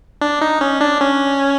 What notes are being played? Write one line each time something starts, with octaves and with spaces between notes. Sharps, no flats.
D4
D#4
C#4
D4
C#4